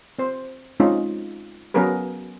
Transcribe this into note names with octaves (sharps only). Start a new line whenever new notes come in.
C4 C5
G#3 C4 C#4 D#4 F4
F#3 B3 C#4 G#4 A#4 B4